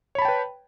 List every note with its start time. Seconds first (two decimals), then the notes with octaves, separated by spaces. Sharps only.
0.15 C#5
0.19 B5
0.22 A5
0.25 G5
0.28 B4